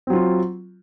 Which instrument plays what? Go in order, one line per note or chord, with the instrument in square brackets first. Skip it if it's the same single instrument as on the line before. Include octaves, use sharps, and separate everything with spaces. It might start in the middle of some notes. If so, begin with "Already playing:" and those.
[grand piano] C4
F#3
F4